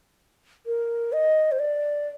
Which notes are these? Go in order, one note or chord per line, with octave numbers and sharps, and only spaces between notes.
A#4
D#5
C5
D5